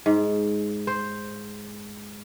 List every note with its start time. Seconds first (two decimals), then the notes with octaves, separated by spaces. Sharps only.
0.06 G#2
0.87 C5